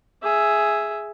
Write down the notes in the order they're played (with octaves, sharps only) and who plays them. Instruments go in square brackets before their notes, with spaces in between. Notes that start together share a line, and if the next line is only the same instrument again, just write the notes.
[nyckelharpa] G#4 E5